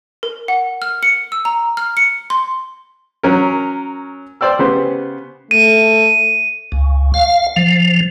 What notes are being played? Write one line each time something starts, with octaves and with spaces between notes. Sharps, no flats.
A#4
F#5
F6
C#7
E6
A#5
F6
C#7
C6
F#3 C#4 A#4
C5 D5 G5 E6
C#3 B3 G4 C5
A3 D#7
C#2
F5
F3